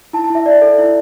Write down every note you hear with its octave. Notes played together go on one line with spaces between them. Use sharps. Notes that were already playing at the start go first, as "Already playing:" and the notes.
E4 A5
A5
E4 E5
D5
A4
E4